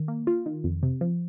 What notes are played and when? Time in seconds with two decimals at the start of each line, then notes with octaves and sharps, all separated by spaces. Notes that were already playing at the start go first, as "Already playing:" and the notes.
Already playing: D#3
0.08 A#3
0.27 F4
0.46 D#3
0.64 F2
0.83 C3
1.01 F3